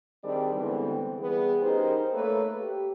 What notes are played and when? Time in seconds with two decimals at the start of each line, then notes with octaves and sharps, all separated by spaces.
0.23 D#3 G3 C4 D4 G#4 D5
0.54 D3 E3 G3 G#3 B3 C4
1.18 E3 G3 B3 G#4
1.62 C#4 D#4 G4 G#4 A#4 C5
2.13 A3 A#3 A4 B4 C#5
2.60 G4